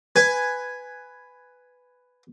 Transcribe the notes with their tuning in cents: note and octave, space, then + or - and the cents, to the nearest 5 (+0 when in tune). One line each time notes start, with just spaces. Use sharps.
B4 +10 G#5 +0